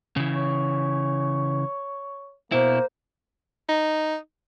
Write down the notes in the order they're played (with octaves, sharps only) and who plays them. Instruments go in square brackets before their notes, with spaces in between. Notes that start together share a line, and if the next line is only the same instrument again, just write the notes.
[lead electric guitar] C#3 E3
[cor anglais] C#5
[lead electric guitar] B2 E4 [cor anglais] A#3 [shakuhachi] C5
[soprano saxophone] D#4